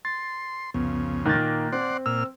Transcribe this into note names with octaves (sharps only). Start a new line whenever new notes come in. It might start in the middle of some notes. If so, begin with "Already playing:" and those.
C6 A6
C2 F2 C#3 B3
A#2 D#3 A#3 F#6 G6 A6
C4 D5 F#5 C6
A#2 E6 F6